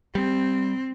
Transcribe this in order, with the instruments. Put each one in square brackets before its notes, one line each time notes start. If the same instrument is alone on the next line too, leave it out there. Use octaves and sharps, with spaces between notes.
[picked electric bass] G3 [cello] C4